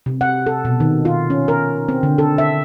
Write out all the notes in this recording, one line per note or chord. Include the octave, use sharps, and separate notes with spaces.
C3
F#5
A4
B2
D#3
F4
C#4
A#4
C4
D3
A4
E5